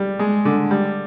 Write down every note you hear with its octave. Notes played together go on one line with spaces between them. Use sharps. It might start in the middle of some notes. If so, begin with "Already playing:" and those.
Already playing: G3
G#3
D3
G3